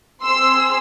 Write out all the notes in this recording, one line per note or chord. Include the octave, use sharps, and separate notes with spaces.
C4 G#4 C6 E6